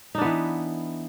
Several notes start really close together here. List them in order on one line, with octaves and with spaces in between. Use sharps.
D#4 D4 B3 E3